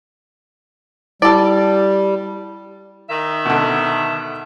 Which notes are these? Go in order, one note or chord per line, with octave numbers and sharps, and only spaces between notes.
G3 E4 A4 D5
D#3 E5
B2 D3